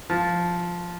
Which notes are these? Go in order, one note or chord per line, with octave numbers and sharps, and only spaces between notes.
F3